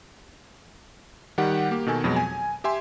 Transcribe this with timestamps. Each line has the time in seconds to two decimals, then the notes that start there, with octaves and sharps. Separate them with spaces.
1.38 D#3 G3 G4 F#5
1.71 A#3 G4
1.86 B2 D#3 A4 G#5
2.04 F2 B2 F#3 G#3
2.16 G#5
2.64 G4 E5 G#5 C6